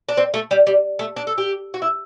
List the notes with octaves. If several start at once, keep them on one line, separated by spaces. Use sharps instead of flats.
D4
C4
A3
G3
G3
A3
D4
A4
G4
F#4
E4